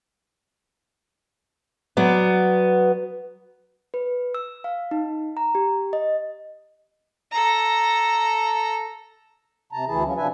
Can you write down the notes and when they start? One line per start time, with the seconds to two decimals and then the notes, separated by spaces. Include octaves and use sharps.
1.97 F#3 B3 D5
3.94 B4
4.35 E6
4.64 F5
4.91 D#4
5.37 A#5
5.55 G4
5.93 D#5
7.32 A4 A#5
9.72 C3 A5 A#5
9.88 D2 E3 E4 G#4 A5
10.04 F3 F#3 C#4
10.17 C3 F3 D4 B4 E5 G#5